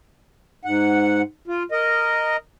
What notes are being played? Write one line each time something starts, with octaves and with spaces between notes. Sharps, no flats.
G#2 F#5
F4
A#4 D#5